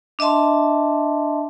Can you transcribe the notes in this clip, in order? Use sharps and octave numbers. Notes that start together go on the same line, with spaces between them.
D4 D#5 E5 A5 C6